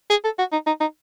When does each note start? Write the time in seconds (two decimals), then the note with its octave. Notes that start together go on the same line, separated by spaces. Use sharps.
0.10 G#4
0.24 A4
0.39 F#4
0.52 D#4
0.66 D#4
0.81 D#4